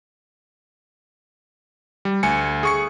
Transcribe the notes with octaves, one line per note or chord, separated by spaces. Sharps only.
G3
D2 G#5 C#7
G#4 C#6 C#7